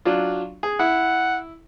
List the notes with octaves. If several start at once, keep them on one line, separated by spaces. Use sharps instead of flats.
F#3 D4 F4
G#4
E4 F#5